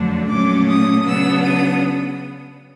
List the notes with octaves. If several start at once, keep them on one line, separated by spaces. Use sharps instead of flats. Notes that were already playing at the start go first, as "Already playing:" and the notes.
Already playing: F2 D3 F#3 A3 D4
A#2 F#3 A3 C#4 D6
D#6
C#3 F#3 B3 D4 E6
D#6